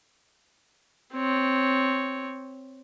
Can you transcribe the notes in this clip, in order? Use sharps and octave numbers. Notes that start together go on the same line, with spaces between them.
C4 C#5